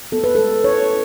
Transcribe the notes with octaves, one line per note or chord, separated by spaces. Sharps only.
B3 A4
B4
G#3 A4
E4 C#5